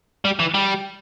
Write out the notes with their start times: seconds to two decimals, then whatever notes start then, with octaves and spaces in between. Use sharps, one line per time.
0.25 G3
0.40 E3
0.54 G3